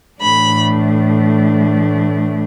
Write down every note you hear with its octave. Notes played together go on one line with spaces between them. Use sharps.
A2 E3 A3 D4 B5